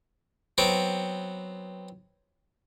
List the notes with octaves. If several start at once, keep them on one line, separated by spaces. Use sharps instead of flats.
F#3 B3 C4 G5